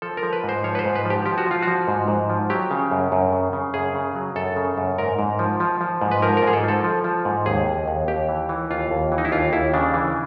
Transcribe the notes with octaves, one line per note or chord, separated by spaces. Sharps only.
F3 A4
A#4
F3
B4
G#2
C5
F3 C#5
B4
C5
G#2
B4
F3 G4
F3 G4
F#4
F3 F4
F#4
F3
G#2
G#2
F3
F#3 G4
C#3
F#2
F#2
C#3
C#3
F#2 G#4
C#3
F#3
F#2 A4
C#3
F#2
G#2 A#4
G#2
F3
F3
F3
G#2
B4
F3 A#4
A#4
G#2 G#4
A4
F3 A4
F3
F3
G#2
D#2 G#4
D#2
D#2
D#2 G4
E3
E3
D#2 F4
D#2
E3
D#4
E4
D#2 F4
D#2 E4
C#3 D4
E3